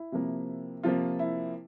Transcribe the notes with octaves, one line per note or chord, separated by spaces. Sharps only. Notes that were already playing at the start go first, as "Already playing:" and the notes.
Already playing: E4
C3 F3 A#3
C3 F3 A#3 F4
E4